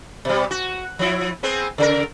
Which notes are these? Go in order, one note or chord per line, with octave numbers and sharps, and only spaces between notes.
B2 G3
F#4
F3 E4
B3 C4 G#4
C#3 G#4 A#4